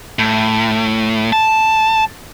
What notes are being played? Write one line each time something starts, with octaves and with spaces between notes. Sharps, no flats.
A2
A5